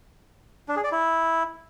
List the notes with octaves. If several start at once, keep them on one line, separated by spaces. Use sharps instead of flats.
D4
G#4
D5
E4